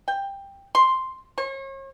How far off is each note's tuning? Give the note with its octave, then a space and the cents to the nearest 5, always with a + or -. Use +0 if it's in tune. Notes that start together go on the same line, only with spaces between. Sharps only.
G5 +15
C6 +0
C#5 -40